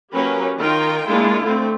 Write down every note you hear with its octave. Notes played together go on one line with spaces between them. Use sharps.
F#3 A#3 C#4 G4 A#4 B4
D#3 F4 A#4 G5
G#3 A#3 D4 E4 F4
D3 A3 C4